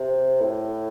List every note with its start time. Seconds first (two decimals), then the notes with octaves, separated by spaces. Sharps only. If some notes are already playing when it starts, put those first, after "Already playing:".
Already playing: C3
0.40 A2